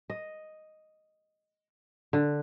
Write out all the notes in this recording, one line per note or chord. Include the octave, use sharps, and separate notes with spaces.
D#5
D3